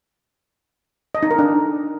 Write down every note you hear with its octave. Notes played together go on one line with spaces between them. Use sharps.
D#5
D#4
A#4
D4